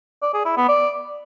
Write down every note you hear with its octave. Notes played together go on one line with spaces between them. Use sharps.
D5
G#4
E4
B3
D5